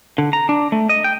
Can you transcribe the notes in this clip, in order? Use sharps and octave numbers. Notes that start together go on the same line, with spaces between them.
D3
A#5
D4
A3
D#5
G5